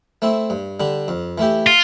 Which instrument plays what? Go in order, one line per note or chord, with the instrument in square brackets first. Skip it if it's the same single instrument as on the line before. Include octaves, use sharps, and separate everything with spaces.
[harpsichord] A3 C4 E4
G2
D3 G3 D4
F2
E3 A3 E4 G4
[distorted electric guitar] F4